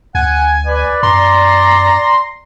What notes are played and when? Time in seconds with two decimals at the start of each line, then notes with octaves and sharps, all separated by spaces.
0.15 D2 F#5 G#5
0.66 B4 D5
1.03 F#2 A#5 C6